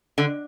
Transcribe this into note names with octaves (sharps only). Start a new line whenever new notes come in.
D3